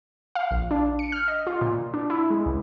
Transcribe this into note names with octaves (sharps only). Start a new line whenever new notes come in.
F5
A#1
D4
C#7
F6
D#5
F4
A#2
D4
E4
G#3
C#2